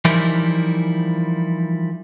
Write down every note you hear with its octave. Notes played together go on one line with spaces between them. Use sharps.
E3 F3 G3 D#4 E4 A#4